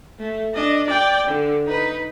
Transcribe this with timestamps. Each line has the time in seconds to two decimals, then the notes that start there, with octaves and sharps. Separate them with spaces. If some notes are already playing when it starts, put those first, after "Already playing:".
0.19 A3
0.55 D4 D#5
0.86 D5 G5
1.27 D3
1.66 D#4 B4